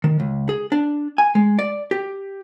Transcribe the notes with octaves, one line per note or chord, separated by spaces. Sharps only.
D#3
C#2
G#4
D4
G#5
G#3
D5
G4